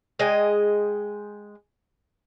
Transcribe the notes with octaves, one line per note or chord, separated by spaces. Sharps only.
G#3 D#5 G5 G#5